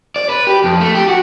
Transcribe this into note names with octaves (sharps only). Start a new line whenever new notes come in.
D5
B4
G4
F2
A3
G4
F#4